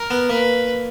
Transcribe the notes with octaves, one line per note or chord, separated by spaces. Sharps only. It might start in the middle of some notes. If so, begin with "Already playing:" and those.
Already playing: A#4
B3
A#3 B4